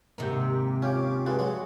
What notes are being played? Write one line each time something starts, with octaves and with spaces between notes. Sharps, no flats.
D#2 G#2 C3 A#3 G4
C#4 F4 G4 D6
G2 G#3 F#4
F#3 G#3